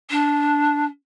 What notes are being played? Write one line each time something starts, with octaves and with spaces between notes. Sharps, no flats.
D4